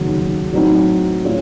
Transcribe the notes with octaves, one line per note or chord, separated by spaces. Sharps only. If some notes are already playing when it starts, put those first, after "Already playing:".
Already playing: F1 D#2 C#3 F#3
A2 F#3 C4 D#4
A2 A3 C#4 F4